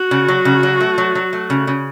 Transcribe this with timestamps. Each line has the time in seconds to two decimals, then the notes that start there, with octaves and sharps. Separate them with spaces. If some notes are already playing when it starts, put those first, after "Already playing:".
Already playing: F#4
0.11 C#3
0.28 F#3
0.45 C#3
0.63 F#3
0.81 A3
0.98 F#3
1.15 F#3
1.33 A3
1.50 C#3
1.67 C#3